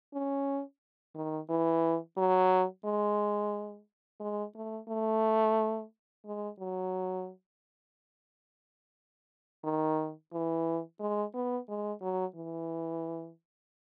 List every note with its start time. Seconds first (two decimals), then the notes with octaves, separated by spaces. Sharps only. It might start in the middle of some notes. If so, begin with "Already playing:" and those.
0.14 C#4
1.15 D#3
1.50 E3
2.17 F#3
2.86 G#3
4.20 G#3
4.55 A3
4.89 A3
6.25 G#3
6.59 F#3
9.64 D#3
10.33 E3
11.00 G#3
11.34 B3
11.69 G#3
12.02 F#3
12.36 E3